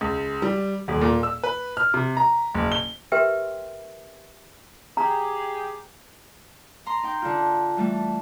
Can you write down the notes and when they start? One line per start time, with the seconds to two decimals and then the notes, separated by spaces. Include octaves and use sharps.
0.01 C#2
0.42 G3
0.88 D#1
1.01 A#2
1.23 E6
1.43 B4
1.77 F6
1.94 C3
2.17 A#5
2.54 F#1
2.72 G7
3.12 G4 A#4 B4 E5 G5 C6
4.97 G4 G#4 A#5
6.86 A#5 C6
7.03 D#4 G5
7.22 D3 F4
7.77 E3 G3 A3